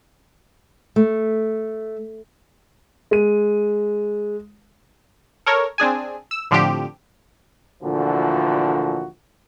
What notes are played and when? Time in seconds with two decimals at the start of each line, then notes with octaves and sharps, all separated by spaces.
0.96 A3
3.11 G#3 D#7
5.46 A4 A#4 C#5
5.78 C4 D4 G#4 G#5
6.31 E6
6.51 A2 D3 F3 C4 D4 G4
7.83 D2 A#2 D3 E3 F3 F#4